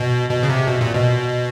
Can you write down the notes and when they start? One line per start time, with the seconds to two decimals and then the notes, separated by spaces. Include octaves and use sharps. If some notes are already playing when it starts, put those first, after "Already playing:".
Already playing: B2
0.29 B2
0.43 C#3
0.49 C3
0.68 B2
0.81 A#2
0.93 B2